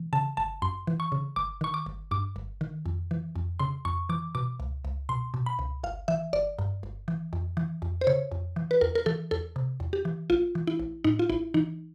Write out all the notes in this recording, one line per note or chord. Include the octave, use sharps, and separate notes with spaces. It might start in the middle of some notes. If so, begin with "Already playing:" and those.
Already playing: E3
C#3 A5
G1 A5
F#2 C6
E3
C#6
C#3
G1 D6
D#3 C#6
D6
G1
G2 D6
G1
D#3
F2
E3
F2
C#3 C6
F2 C#6
E3 D6
B2 D6
C#2
C#2
B2 C6
B2
B5
C#2
G1 F5
E3 E5
G1 D5
G2
G1
E3
F2
E3
F2
C5
C#3 C#5
F2
E3
B4
E2 A#4
A#4
E3 A4
E2 A4
C3
E2
G4
E3
A1 F4
E3
E4
A1
A2 D#4
F4
A1 E4
E3 D#4